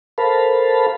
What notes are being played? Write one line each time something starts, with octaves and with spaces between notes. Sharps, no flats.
A4 A#4 C5 F5 A5 B5